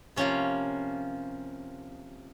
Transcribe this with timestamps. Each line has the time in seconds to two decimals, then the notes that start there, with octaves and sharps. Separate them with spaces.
0.16 C3 F3 A#3 C#4